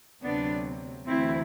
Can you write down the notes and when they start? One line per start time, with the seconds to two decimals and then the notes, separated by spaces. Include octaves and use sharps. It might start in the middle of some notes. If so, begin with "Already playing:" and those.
0.23 D2 C3 F#3 B3 D4
1.06 D2 C3 E3 C4 E4